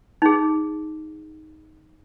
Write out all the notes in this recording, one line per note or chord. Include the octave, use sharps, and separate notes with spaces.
D#4 G#4